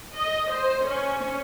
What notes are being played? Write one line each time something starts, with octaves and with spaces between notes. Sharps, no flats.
D#5
C5
C#4